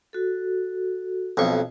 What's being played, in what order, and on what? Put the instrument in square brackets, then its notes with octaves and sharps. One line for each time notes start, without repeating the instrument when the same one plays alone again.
[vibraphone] F#4 A4
[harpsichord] B1 F2 C#6